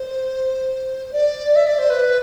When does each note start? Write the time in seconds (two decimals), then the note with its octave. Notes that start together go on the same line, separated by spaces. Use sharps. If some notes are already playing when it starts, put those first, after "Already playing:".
Already playing: C5
1.12 D5
1.56 E5
1.67 D5
1.79 C5
1.90 B4